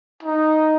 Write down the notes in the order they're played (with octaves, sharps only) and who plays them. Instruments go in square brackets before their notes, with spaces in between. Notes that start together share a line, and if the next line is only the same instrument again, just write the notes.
[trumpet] D#4